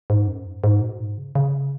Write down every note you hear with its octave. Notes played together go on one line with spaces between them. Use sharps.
G#2
F#2
G#2
B2
G#2
C#3
C#3